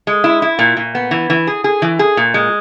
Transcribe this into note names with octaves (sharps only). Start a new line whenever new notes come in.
G#3
E4
E4
A#2
A#2
B3
E3
E3
G#4
G#4
E3
G#4
A#2
G#3